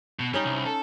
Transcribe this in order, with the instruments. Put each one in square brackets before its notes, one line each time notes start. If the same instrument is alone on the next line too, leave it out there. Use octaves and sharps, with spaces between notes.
[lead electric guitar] B2
[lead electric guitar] G3 [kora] C#4 D#4
[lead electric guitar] C2
A4